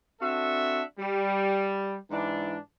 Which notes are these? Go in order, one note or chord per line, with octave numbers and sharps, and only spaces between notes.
C4 D4 F#4 A4 E5
G3
G#2 E3 D4